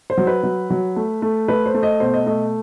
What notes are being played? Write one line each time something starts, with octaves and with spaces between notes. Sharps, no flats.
C5
F#3
B4
F#3
F#3
A3
A3
A3 B4
C5
A3
D#5
B2 C5
D#5
A3 D#5